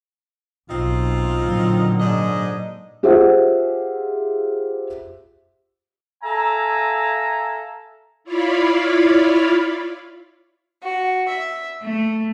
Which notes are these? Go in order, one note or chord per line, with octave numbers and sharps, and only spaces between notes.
B1 C4 D#4 F4
A#2 D3 F#3
G#2 D4 D#5
F4 G4 G#4 C5 E5 F#5
A4 E5 F5 G#5 A#5
E4 F4 C#5 D5 F5 B5
F#4
E5
A3